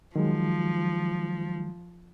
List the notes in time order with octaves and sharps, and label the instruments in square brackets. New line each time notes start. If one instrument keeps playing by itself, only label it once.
[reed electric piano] D#3 F#3 G#3 [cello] F3